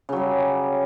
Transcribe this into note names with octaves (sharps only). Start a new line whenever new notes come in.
C#3 F#3 G3